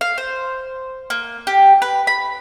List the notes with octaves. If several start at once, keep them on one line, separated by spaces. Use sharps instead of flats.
F5
C5
A#3
G4
B4
B5